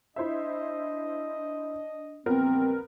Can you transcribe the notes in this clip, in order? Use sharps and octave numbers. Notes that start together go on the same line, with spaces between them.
D4 E4 C5 D#5 E5
A#1 E2 G3 B3 C4 A#4